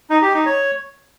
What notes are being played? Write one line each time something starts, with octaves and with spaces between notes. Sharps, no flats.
D#4
G4
D#4
C#5